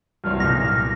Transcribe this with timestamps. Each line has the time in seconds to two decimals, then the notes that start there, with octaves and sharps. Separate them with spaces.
0.24 C2 G2 F3 F#3 E4 F6
0.40 B1 A#2 A#6